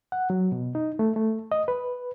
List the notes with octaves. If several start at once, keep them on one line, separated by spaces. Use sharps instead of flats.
F#5
F#3
B2
D#4
A3
A3
D#5
B4